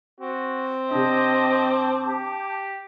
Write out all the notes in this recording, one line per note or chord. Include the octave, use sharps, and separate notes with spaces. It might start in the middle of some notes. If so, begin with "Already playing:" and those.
C4 F#4
C3 D4 D#5 A5 D6 G6
G4